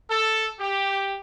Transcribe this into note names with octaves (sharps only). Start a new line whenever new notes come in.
A4
G4